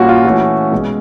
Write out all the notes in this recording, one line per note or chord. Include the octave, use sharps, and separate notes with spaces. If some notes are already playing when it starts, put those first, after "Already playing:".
Already playing: A#2 G3 A#3 C#4 F#4
F4
E3 A3 C#4 F#4
B2 G#3 C#4